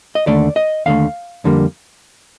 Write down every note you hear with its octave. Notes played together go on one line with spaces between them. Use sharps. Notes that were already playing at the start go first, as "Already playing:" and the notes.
D#5
D#2 D3 A3 D5
D#5
D#2 D3 A3 F5
F2 D3 G3 A#3